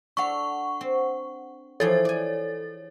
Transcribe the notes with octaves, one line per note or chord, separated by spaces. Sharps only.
D4 A4 F#5 C#6
C4
E3 F3 G#4 A4 C#5 A6
D5 G#5